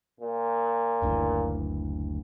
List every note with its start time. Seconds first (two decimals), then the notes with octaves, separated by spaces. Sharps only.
0.20 A#2
1.02 F#1 D2 E3